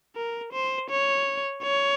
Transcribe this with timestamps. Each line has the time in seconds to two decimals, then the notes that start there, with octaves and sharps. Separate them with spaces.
0.16 A#4
0.53 C5
0.90 C#5
1.63 C#5